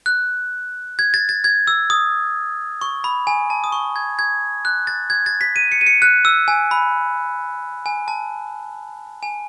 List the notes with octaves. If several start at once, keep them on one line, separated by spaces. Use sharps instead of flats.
F#6
G#6
A6
A6
G#6
E6
D#6
C#6
B5
G#5
A5
D#6
C#6
G#6
G#6
F#6
A6
G#6
A6
B6
D#7
C#7
D#7
C#7
F#6
E6
G#5
B5
G#5
A5
G#5